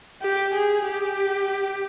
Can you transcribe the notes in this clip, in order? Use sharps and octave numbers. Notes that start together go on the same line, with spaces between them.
G4
G#4
G4